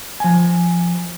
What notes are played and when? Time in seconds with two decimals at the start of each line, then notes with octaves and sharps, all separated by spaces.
0.20 F3 G#5